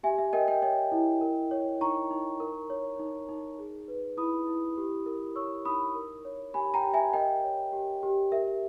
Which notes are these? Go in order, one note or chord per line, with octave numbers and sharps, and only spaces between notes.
G4 E5 G#5
E5
A#4 D#5 G5
D#5 G5
C#5 D#5 G5
E4
A#4
C#5
D#4 A#5 C#6
D#4
A#4
C#5
D#4
D#4
G#4
B4
E4 B5 D#6
E4
G4
A#4
C#5 C#6 E6
D#4 B5 D#6
A#4
C#5
G4 G#5 B5
G5 A#5
G4
E5 G#5
A#4 D#5 G5
C#5
G4
G4
A#4 E5